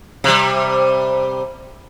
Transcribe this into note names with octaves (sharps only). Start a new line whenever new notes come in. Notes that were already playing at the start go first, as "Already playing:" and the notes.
C3 G3